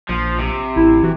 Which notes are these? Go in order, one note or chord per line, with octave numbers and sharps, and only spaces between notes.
A#1 F3
C3
A1 E4
E3 F#4